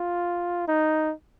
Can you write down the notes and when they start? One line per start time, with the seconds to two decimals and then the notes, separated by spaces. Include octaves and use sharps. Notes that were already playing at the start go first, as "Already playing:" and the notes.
Already playing: F4
0.68 D#4